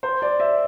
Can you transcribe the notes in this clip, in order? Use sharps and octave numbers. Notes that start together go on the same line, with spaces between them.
C5
D5
E5